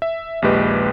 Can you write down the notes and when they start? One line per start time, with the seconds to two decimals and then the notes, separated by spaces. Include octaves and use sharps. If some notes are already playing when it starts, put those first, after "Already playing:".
0.02 E5
0.42 A#1 D#2 G#3 G4 B4 D#5